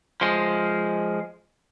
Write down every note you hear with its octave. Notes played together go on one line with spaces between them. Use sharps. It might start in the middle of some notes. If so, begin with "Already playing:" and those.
F3 G#3